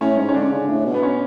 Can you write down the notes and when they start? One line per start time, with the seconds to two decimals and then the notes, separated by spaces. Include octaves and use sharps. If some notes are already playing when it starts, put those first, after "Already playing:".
0.01 A2 C#4
0.17 G#2 C#4
0.29 C#4
0.34 D3 D4
0.52 C#3
0.68 A2
0.86 B2
0.94 B3
1.03 C#4